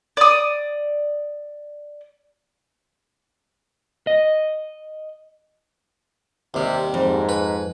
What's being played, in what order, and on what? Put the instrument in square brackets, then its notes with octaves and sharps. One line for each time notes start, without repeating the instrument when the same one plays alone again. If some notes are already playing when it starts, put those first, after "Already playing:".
[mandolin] D5 D#6
[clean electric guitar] D#5
[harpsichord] D#2 G3 [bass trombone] C3
[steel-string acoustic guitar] F2 [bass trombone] G#2
[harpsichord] B4